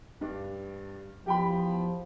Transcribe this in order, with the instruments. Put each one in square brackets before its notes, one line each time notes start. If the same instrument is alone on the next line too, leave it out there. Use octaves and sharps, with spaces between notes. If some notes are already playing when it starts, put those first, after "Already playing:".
[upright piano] G2 D4
[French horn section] E2 F3 [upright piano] G4 G5 B5